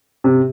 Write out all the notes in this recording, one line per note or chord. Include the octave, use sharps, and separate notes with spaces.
C3